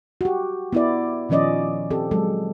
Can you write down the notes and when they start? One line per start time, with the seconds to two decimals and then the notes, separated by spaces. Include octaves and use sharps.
0.21 F#4 G4
0.73 B3 E4 D5
1.29 A#2 D#3 F3 C#4 D5 D#5
1.90 C4 G4 A4
2.11 F#3 G#3 A4